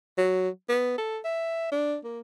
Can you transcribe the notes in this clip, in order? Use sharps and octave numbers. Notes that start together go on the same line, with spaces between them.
F#3
B3
A4
E5
D4
A#3